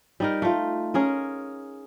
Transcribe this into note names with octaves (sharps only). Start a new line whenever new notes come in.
G3 D#4 A#4
A3 F4
C#4 G#4 A#4